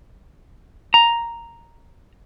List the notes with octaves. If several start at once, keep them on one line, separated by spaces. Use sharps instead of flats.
A#5